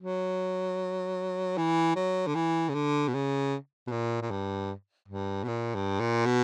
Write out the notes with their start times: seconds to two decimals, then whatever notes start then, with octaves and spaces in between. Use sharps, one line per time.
0.01 F#3
1.58 E3
1.96 F#3
2.27 D3
2.35 E3
2.69 C#3
2.74 D3
3.08 B2
3.14 C#3
3.87 B2
3.91 A#2
4.22 A#2
4.31 G2
5.08 G2
5.44 B2
5.48 A#2
5.75 G2
6.00 A#2
6.26 B2